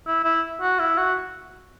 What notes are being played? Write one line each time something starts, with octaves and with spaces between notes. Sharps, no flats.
E4
E4
F#4
E4
F#4